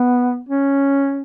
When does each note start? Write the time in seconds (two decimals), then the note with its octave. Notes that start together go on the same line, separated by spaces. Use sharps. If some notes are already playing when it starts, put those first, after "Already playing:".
Already playing: B3
0.49 C#4